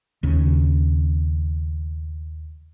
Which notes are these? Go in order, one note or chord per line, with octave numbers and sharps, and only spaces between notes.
D#2 C#3